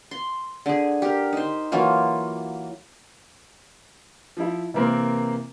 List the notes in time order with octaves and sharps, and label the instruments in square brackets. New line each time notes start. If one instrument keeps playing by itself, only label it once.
[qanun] C6
D3 G#4
G4 A#4
D#4 C5
E3 F#3 A#3 F4
[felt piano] F3 E4
C3 E3 A#3 C4 A#4